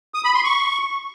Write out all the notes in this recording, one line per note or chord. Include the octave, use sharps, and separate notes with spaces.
D#6
B5
C6
C#6